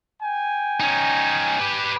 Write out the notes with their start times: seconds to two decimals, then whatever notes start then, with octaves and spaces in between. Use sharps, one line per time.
0.22 G5 G#5
0.80 C#4 D#4
1.60 G4 B4